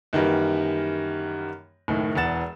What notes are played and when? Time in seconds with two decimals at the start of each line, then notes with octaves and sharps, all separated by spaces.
0.13 F#2 D#3 E3 G3 A#3
1.88 F#1 A2 D#3
2.15 E1 E2 F#5 A6 E7